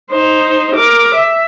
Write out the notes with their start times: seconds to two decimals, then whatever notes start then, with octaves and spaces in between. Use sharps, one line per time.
0.11 D#4 C5
0.75 A#4 D6
1.15 E5